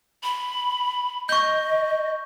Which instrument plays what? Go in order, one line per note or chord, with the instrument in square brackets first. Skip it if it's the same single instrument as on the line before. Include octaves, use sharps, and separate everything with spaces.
[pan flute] B5
[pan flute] D#5 [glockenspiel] C#6 G6